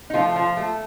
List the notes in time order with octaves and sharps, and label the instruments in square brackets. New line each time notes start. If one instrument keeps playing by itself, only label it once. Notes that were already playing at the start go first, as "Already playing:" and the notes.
[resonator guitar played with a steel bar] D#4
F3 A3 F4
F3
A3